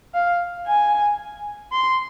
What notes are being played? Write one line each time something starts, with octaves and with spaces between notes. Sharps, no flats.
F5
G#5
C6